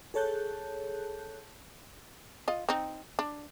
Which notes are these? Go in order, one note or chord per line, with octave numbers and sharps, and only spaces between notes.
G#4 A4 C#5 A5 F#6 G6
F4 D#5
C4 D#4
D4